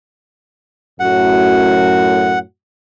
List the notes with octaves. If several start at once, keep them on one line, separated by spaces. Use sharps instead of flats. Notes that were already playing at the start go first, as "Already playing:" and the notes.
F#2 A2 F#4 F#5